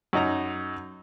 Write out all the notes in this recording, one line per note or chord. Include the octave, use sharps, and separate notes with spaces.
F#2 D#4 A#5